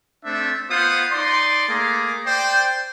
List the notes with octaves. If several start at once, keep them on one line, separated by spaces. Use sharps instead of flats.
A3 C4 D4 C5 E5
B3 F4 C5 F#5 D#6
D#4 D5 C6
A3 A#3 G#4 A#5 D6
C5 D5 G5